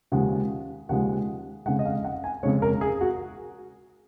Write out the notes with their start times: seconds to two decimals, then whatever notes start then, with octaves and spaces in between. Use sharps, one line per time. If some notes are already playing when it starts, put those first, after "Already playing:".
0.12 D#2 C#3 F3 G#3 F#5
0.89 D#2 C#3 F3 G#3 F#5
1.66 F2 C#3 G#3 F#5
1.79 D#5
1.85 F5
2.04 F#5
2.24 G#5
2.43 F2 C#3 G#3 C#5
2.62 A#4
2.81 G#4
3.01 F#4